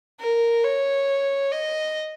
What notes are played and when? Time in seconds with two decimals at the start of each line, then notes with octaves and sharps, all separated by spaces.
0.20 A#4
0.64 C#5
1.52 D#5